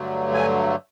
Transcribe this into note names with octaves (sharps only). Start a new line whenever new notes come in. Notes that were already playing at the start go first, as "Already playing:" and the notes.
Already playing: G2 D3 F#3 A3
G#5